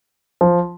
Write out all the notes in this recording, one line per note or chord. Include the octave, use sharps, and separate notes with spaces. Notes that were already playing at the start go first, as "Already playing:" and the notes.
F3